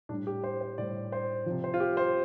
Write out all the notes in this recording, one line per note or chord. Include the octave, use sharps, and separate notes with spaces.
A2 G3 D4
G4
C5
C5
A2 G3 D5
C5
C3 F3
C5
F4
G4
C5